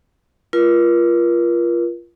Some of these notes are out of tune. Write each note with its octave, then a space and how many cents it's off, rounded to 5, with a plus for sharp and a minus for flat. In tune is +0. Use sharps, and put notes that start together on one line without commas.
F4 -20 A#4 +40